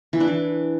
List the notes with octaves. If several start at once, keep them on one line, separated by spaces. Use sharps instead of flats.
E3
D4
E3